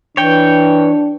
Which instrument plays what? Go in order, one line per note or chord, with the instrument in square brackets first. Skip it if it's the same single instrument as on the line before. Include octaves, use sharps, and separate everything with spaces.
[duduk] E3 [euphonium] D4 [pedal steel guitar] C#5 G5